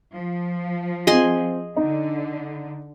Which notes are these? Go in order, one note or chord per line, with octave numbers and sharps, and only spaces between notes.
F3
C4 F4 G#4 D#5 C6
D3 D#4